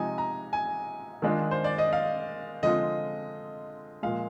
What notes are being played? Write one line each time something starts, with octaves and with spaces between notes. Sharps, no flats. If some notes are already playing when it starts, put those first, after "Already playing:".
Already playing: C3 F3 G#3 D#4 G#5
A#5
G#5
D#3 G#3 D4 F4
C5
D5
D#5
F5
D3 F3 G#3 C4 F4 D#5
A#2 F3 G#3 F5